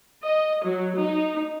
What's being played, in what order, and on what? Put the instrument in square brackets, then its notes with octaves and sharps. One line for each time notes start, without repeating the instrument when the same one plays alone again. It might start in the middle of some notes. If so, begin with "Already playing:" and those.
[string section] D#5
F#3
D#4